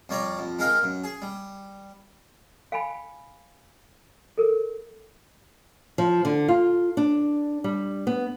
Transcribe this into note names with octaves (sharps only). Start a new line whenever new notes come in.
F2 G3 C#5 D5 A#5
F2
G#3 D#4 A#4 F5 G5
F#2
G#4
G3
F5 G5 G#5 B5
A4 A#4
F3
D3
F4
D4
G3
B3